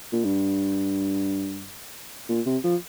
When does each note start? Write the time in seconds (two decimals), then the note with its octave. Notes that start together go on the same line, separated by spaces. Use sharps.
0.12 A#2
0.25 G2
2.29 A#2
2.46 C3
2.64 F3